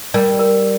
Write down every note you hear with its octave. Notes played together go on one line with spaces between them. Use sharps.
G3 A#4
A#4